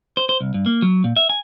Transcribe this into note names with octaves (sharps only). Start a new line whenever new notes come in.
C5
C5
C2
G2
A#3
F#3
A#2
E5
G#5